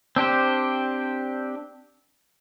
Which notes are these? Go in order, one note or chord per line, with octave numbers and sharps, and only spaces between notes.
C4 D4 G4 C5